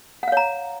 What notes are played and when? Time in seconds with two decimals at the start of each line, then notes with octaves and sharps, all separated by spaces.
0.23 F#5
0.28 F5
0.32 C#5
0.37 A#5